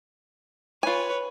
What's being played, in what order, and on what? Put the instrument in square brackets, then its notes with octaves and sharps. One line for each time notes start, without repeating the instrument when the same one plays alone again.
[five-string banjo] F4 G#5 [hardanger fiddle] B4 C#5